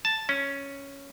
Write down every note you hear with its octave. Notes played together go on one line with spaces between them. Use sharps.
A5
C#4